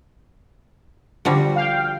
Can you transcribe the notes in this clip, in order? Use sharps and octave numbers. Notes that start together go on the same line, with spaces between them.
D3 F3 G3 F#4
F5 G5